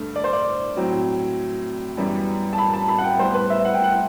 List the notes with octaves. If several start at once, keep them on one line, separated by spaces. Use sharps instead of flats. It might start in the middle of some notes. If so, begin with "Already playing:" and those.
Already playing: G2 D3 A3
D5
C5
D5
A2 F#3 C4
F#2 E3 G3 B3
A5
B5
A5
B5
F#5
G5
A2 G3 B3 C5
B4
E5
F#5
G5
F#5